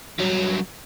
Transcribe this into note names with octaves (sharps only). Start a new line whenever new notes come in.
G2 F#3